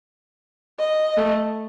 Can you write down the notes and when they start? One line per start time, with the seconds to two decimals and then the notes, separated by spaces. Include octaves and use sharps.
0.79 D#5
1.17 A3